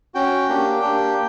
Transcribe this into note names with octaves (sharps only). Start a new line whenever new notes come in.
C#4 F#4 G5
A#3 D4 G4
A#3 D4 G4